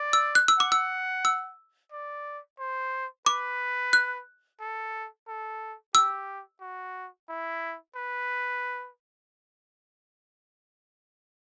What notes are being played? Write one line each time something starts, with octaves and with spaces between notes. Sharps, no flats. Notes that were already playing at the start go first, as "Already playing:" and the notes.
Already playing: D5
E6
F#6
E6
F#5 D6
E6
E6
D5
C5
B4 D6
F#6
A4
A4
G4 E6
F#4
E4
B4